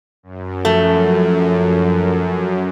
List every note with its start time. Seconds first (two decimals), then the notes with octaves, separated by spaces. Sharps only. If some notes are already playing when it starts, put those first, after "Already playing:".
0.23 F#2
0.65 F3 A3